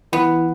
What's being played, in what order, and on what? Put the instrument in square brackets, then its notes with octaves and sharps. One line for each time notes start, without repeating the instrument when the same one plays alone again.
[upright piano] E3 [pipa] B3